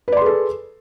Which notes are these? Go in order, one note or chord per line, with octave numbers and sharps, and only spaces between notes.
G#4 A4 B4 D5 C6